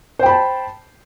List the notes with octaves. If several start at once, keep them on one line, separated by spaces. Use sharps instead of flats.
C5 G5 A5 B5